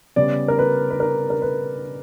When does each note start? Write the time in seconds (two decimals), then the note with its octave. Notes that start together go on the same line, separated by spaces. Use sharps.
0.16 C#3 G3 B3 D5
0.48 A#4
0.59 B4
0.90 B4
1.00 A#4
1.30 A#4
1.42 B4